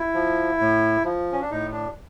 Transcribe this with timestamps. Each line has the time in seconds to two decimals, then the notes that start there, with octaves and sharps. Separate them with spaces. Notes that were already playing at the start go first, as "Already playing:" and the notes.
Already playing: E4
0.14 F3
0.60 A2
1.04 F3
1.32 C#4
1.41 D4
1.51 A2 D#4
1.72 D4